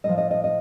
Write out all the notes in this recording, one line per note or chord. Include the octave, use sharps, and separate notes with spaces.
A2 F3 D#5
D#5
D#5
D#5